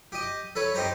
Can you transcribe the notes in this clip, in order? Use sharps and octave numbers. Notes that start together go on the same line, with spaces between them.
G4 D#5
A4 B4 C#5
C4 D#4 G4 C5 A#5